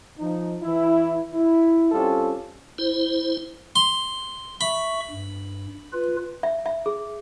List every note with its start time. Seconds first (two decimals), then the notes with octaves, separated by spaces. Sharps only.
0.19 F3 D#4
0.63 E3 E4
1.34 E4
1.92 G3 C4 C#4 F4 G4 A4
2.78 E4 C5
3.76 C6
4.61 E5 B5 C#6
5.11 G2
5.93 F4 B4
6.43 E5
6.66 E5
6.86 G#4